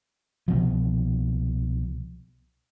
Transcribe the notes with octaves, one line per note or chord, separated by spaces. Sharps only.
C2 B2 F3